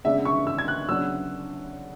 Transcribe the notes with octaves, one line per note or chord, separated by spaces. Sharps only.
C#3 G#3 B3 D4 E5
C#6
E6
G#6
F#6
C#3 F#3 B3 D4 E6